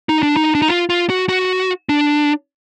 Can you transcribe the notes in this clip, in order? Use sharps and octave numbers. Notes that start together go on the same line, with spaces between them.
D#4
D4
D#4
D4
D#4
F4
F4
F#4
F#4
D4